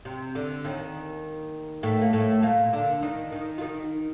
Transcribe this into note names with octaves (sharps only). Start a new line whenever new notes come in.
C3
D3
D#2 D#3
A2 A3
A#3
A2 A3
A#2 A#3
D3 D4
D#3 D#4
D#3 D#4
F4
D#3 D#4